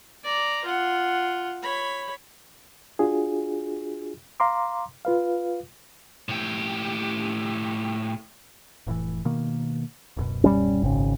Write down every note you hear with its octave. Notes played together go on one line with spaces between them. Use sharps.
D5 A#5
F4 F#5
C#5 B5
D4 F4 F#4 G#4
F5 A#5 C6 D6
F4 B4 F5
A2 G4
F1 A2 E3
B2 D#3 A#3
D1 F#2 B2
G3 C#4
G#1 C#3